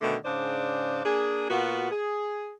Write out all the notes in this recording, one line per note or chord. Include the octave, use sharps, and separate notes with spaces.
B2 D3 D#3 A3
G#2 C#3 D4 C5 D5
A#3 D4 G#4
A#2 B3 F4 F#4
G#4